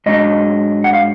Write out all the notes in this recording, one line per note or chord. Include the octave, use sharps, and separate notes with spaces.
G#2 F#3 D4 D#5
F#5
F5